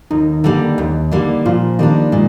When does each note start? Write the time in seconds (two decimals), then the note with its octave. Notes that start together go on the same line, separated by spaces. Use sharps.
0.10 D#2 D#3 D#4
0.44 D3 G3 A#3
0.78 D#2
1.11 D3 G3 A#3
1.45 A#2 F3 F4
1.79 D#3 G3 A#3 D4 D#4
2.12 A#2 G#3